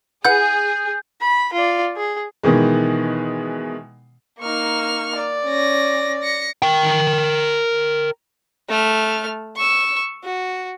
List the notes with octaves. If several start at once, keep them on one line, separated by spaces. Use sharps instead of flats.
E4 G#4 B4 F#5 G6
B5
F4 D5
G#4
B2 D#3 E3 G#3
A#3 D#4 C#6 F6
D5
C#4 A#6
A#6 C#7
A#4 G5
A3 F6
C#6 E6
F#4